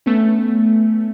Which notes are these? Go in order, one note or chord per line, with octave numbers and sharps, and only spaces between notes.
A3 B3 C#4